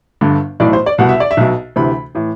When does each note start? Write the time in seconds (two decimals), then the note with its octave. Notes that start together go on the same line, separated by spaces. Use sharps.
0.21 G1 G2 D3
0.60 B1 A2 E3 D5
0.73 C5
0.86 D5
0.98 C2 B2 F#5
1.09 E5
1.20 D5
1.31 E5
1.37 B1 B2
1.76 D2 C3 E3 B5
2.15 A2 E3